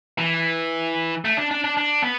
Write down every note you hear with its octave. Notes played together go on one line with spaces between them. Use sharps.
E3
A3
D4
D4
D4
D4
B3